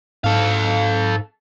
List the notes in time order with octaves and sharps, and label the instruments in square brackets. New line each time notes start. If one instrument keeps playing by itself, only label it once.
[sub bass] G#2 [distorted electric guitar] A4 F5